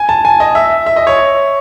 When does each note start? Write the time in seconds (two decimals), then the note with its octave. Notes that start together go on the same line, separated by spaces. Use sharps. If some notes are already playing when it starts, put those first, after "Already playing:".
Already playing: G#5
0.09 A5
0.25 G#5
0.40 D#5
0.55 E5
0.86 E5
0.96 D#5
1.07 C#5